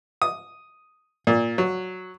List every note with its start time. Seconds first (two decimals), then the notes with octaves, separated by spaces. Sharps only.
0.22 D#6
1.27 A#2
1.58 F#3